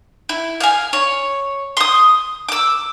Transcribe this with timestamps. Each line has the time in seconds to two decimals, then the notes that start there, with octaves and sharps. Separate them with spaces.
0.29 E4
0.60 F5 G#5
0.93 C#5
1.77 C6 D#6
2.49 D6 E6